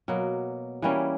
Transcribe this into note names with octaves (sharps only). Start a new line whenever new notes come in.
B2 F#3 A#3
E3 G3 A#3 C#4